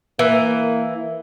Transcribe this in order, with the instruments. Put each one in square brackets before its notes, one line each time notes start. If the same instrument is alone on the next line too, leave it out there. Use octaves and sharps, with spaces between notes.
[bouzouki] E3 [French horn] A#3